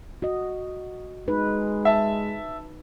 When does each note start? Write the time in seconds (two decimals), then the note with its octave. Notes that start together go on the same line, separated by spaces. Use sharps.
0.22 F#4 D#5
1.28 G#3 D#4 B4
1.85 E5 A5